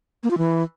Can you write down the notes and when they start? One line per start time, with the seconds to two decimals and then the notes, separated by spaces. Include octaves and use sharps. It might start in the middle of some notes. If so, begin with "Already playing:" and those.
0.23 A#3
0.31 F4
0.38 E3